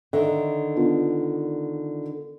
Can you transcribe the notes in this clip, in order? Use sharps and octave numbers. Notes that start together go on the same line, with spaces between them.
D3 D#3 E5
B3 D4 F4